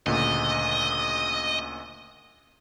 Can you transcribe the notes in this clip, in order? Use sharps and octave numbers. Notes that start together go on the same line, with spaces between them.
D2 A#2 C#3 D#5